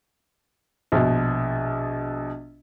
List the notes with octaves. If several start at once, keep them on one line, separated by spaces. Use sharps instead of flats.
A#1 B2